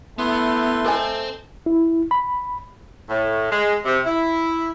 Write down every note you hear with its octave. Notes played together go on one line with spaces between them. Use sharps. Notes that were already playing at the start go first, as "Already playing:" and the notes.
A3 B3 E4 B4 C6
A4 C5 D#5 G5 G#5
E4
B5
A2
G#3
C3
E4